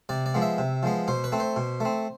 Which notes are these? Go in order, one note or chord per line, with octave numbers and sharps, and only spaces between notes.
C3 D5
D5
F3 G#3 B3
E5
C3
F3 G#3 B3
B2 C5
B4
A3 C4
C5
B2
A3 C4